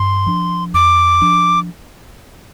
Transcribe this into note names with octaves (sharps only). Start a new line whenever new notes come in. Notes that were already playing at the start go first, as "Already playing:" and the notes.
Already playing: G2 C6
F3 D4
F2 D6
F3 D4